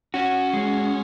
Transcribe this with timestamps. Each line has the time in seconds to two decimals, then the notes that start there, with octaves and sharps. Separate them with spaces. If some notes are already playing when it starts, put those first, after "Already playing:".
0.14 C#4 F#4
0.53 G#3